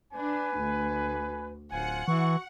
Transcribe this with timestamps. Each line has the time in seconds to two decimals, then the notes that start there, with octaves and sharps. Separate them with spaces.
0.14 D4 B4 G#5
0.59 D2
1.72 D1 F4 C5 F#5 G#5
2.08 E3 F#4 C#6